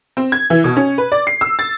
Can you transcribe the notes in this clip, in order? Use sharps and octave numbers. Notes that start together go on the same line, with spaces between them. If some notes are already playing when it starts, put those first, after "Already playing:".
C4
G#6
E3
B2
C#4
B4
D5
C7
E6
A6